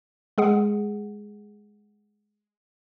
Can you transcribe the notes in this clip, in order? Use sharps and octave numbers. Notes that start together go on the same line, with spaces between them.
G#3 G#4 F#5